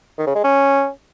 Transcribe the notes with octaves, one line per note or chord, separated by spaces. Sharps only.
D#3
C#3
G#3
C#4